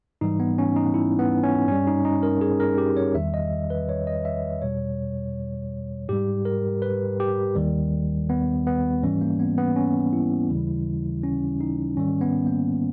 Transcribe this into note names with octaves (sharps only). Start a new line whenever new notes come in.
G#2 E3 G3 D#4
B3
C#4
D#4
E4
B3
C#4
G2 G3 C#4
D#4
D#4
A#4
G#4
A#4
G4
C#5
E2 D#3 G3 E5
D#5
B4
C#5
D#5
E5
E2 B2 G3 C#5
G#2 G3 G4
A#4
B4
G4
D#2 D#3 G3
B3
B3
G#2 E3 G3 C#4
A#3
B3
B3
C#4
E4
D#2 C#3 E3 G3
C#4
D#4
G#2 D#3 G3 C#4
B3
A#3